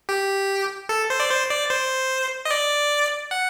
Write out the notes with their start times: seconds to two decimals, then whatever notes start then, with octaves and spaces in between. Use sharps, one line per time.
0.09 G4
0.89 A4
1.10 C5
1.20 D5
1.30 C5
1.50 D5
1.70 C5
2.45 D#5
2.51 D5
3.31 F#5